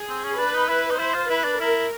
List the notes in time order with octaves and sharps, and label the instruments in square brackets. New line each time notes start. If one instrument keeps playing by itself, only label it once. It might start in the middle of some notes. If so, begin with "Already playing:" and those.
Already playing: [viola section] G#4
[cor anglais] C4
C#4
[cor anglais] D4 [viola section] B4
[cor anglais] D#4
E4
D#4
[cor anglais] E4 [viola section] C5
[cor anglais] F4
[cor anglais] E4 [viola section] B4
[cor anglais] D4
[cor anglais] E4 [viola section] A#4